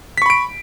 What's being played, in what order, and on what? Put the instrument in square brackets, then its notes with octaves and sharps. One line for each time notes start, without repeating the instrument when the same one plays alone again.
[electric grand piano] B6
C#6
B5
D7